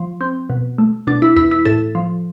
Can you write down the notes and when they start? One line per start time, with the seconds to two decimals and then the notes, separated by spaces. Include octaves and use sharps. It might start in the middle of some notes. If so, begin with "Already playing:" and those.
Already playing: F3
0.21 C4
0.50 B2
0.78 A3
1.07 B2 D4
1.22 E4
1.36 E2 E4
1.51 E4
1.65 A2 A4
1.95 F3